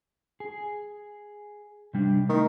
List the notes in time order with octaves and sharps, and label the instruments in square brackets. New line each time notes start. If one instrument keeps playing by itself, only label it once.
[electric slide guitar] G#4
C3 G3 D4
[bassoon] D#3 [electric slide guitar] A3